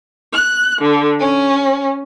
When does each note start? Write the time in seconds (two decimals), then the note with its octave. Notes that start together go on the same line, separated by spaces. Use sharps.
0.33 F#6
0.80 D3
1.19 C#4